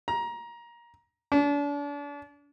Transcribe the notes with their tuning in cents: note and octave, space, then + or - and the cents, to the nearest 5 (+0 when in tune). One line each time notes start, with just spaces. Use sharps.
A#5 +20
D4 -35